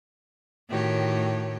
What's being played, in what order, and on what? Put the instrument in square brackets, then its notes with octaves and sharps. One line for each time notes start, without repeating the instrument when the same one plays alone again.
[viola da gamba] A2 D#3 [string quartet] F#4 G4 C#5